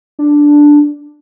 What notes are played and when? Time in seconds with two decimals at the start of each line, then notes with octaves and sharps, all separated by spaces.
0.19 D4